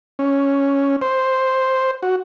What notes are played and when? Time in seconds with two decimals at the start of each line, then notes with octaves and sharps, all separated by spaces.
0.19 C#4
1.01 C5
2.03 F#4